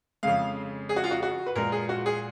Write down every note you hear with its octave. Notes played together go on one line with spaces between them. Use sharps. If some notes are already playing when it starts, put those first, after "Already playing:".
F2 C#3 G#3 F5
G#4
F#4
F4
F#4
F#4
B4
A#2 F3 G#3 A#4
G#4
F#4
G#4